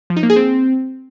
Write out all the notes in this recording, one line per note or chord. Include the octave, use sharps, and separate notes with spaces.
F3
D#4
A#3
G#4
C4